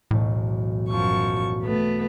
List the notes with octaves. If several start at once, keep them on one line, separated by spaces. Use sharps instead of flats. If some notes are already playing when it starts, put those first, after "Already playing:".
E1 B1 A2
F#2 F3 C#6
A3 B3